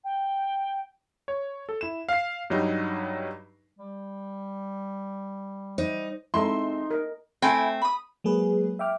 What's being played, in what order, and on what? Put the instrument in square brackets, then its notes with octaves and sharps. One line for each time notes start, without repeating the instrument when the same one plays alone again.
[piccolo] G5
[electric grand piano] C#5
A4
E4 E7
F5 C7
G2 F#3 G3 D#4
[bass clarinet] G3
[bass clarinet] G3 [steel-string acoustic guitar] D#4 [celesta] C5
[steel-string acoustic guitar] G#3 C4 E5 [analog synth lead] D#4 [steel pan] E4 A4 [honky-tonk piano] C6
[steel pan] A#4 D#5
[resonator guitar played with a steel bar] A3 C4 [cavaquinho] E4 G5 G#5
[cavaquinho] B5 D#6
[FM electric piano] F#3 G#3 A#3 G#4 B4
E5 G5 D6 F6